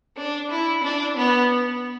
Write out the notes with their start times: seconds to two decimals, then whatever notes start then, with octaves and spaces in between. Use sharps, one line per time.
0.16 D4
0.50 E4
0.83 D4
1.17 B3